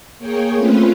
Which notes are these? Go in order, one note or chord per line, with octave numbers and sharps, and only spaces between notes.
A#3 G#4 C#5 G5
A3 C4 C#4 F4 B4